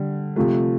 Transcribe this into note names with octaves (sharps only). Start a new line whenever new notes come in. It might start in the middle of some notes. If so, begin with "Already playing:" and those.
Already playing: D3 G3
C3 F3 A3